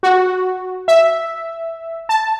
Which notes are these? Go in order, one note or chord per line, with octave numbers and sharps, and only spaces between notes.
F#4
E5
A5